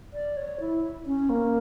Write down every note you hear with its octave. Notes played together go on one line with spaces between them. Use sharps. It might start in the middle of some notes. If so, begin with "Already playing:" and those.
D5
C#5
E4
C#4
A#3